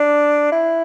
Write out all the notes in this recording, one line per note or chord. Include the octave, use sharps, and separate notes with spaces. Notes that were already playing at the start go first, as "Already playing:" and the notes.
Already playing: D4
E4